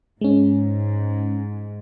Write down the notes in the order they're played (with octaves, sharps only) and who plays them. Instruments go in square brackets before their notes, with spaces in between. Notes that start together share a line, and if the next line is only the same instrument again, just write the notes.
[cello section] G#2 [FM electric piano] G#3 C#4